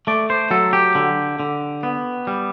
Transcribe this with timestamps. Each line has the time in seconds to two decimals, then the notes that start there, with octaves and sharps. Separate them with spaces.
0.07 A3 D5
0.30 C5
0.51 F#3 A4
0.73 G4
0.95 D3
1.40 D3
1.83 B3
2.27 G3